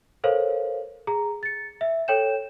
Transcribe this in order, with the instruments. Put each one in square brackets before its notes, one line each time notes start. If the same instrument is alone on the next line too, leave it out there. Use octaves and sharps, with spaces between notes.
[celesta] A4 A#4 C5 C#5 F5
G#4 A#5
A6 C#7
E5
A4 C#5 G5 G6 E7